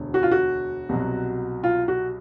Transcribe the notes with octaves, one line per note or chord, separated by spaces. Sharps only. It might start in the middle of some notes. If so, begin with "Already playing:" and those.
Already playing: E1 D2 D3
F#4
F4
F#4
C2 B2 F#3
F4
F#4